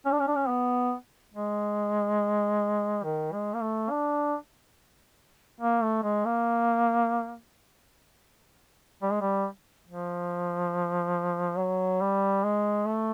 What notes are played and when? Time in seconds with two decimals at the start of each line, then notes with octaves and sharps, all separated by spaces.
0.06 C#4
0.12 D4
0.20 C#4
0.28 D4
0.35 C#4
0.49 B3
1.34 G#3
3.04 D#3
3.33 G#3
3.54 A#3
3.61 A3
3.90 D4
5.61 A#3
5.83 A3
6.03 G#3
6.25 A#3
9.02 G3
9.11 G#3
9.21 G3
9.87 F3
11.58 F#3
12.01 G3
12.44 G#3
12.87 A3